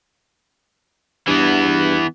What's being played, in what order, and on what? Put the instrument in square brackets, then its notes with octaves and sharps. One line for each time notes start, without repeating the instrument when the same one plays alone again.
[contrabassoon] G2 [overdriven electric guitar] E3 B3